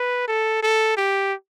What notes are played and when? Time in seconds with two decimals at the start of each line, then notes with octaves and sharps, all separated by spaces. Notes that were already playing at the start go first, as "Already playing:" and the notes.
Already playing: B4
0.28 A4
0.63 A4
0.97 G4